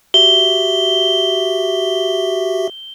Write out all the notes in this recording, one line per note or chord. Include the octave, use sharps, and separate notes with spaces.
F#4 G4 E5 G7